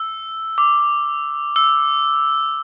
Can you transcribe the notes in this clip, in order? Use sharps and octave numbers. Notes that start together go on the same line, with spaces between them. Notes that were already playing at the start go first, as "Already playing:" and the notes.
Already playing: E6
D6
E6